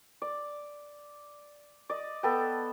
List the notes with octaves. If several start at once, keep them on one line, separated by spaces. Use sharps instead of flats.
D5
D5 D#5
B3 A4 B4 G5